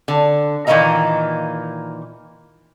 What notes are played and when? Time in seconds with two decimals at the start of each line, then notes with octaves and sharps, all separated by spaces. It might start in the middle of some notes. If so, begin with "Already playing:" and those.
0.08 D3
0.67 A#2 D#3 E3 A#3 D#5 A#5